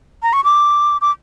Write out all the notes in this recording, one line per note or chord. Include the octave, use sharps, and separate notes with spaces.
A#5
C#6
D6
D6